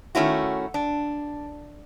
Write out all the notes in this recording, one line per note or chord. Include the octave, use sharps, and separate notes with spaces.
D#3 A3 C#4 E4 F#4
D4